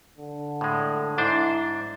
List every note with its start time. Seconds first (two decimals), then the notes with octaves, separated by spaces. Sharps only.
0.17 D3
0.61 A2 G#3
1.18 G#2 D4 E4 C5